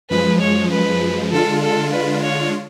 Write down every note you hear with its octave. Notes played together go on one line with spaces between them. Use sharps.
F#2 F3 G#3 B4
C#5
B4
D3 G#3 D4 F4 A4
A4
B4
C#5